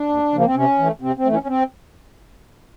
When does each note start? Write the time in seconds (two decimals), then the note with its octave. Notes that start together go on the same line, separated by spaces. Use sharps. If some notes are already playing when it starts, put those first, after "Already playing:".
Already playing: D4
0.09 D#2
0.32 C#3 F3 A#3
0.45 C4
0.55 C3 C#4
0.79 E3 A3
1.01 C3 C4
1.17 C4
1.25 E3 A3
1.33 C#4
1.43 C#4
1.47 C4